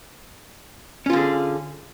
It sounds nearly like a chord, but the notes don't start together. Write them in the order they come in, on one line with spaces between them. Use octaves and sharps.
C#4 F4 D3 G#4